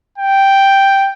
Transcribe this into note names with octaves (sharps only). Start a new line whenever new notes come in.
G5